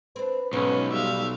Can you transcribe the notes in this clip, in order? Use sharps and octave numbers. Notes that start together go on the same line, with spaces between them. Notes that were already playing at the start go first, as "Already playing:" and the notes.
C4 D4 B4
B1 G#2 C#4 B4
G3 E5 F5